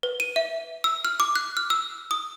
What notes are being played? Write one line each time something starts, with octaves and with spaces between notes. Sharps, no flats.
B4
D#7
E5
E6
F6
D6
F#6
F6
E6
D#6